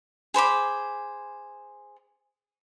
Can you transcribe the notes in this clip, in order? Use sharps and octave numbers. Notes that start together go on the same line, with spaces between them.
G#4 C5 B5 D6